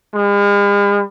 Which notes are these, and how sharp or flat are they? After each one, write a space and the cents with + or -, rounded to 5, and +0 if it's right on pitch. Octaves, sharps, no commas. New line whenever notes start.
G#3 -45